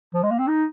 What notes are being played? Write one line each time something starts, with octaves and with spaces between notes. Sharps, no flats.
F3
G#3
A#3
C4
D#4